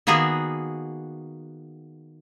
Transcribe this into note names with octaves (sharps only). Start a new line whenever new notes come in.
D#3 A#3 B3 F#4 G#4